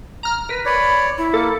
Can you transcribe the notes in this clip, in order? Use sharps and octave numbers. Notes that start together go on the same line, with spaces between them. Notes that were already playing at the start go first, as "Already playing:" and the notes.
A#5 F6
A#4 B4
C#5 D5 B5
E4
A#3 A4